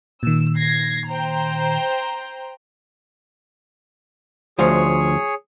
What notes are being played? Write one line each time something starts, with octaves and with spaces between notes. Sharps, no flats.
A#2 D#3 E6
G#6 A#6 C7
C5 G5 A#5
D2 F3 G#4 C#5